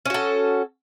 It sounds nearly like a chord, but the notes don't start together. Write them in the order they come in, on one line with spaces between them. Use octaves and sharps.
C#4 F#4 A4